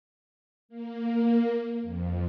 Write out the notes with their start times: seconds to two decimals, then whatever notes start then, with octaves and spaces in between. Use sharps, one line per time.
0.69 A#3
1.82 F2